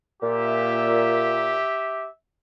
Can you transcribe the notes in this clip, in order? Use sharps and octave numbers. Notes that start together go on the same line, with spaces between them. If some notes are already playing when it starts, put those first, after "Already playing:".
A#2 G4 E5